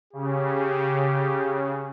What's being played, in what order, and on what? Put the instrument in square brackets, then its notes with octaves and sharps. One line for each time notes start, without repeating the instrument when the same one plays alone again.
[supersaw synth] C#3 [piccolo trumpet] G4